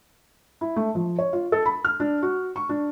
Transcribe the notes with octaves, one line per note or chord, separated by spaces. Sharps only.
E4
A3
F3
C#5
F4
A4
B5
F6
D4
F#4
C#6
D4